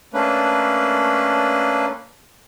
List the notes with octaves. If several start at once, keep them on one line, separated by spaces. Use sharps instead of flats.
A3 A#3 C#4 D4 B4